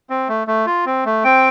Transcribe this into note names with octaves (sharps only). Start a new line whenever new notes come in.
C4
A3
A3
F4
C4
A3
C4 G5